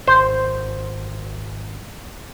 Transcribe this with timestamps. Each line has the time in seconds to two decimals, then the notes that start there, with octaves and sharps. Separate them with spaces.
0.08 G#1 C5